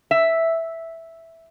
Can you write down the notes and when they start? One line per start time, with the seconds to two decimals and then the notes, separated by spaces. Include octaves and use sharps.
0.11 E5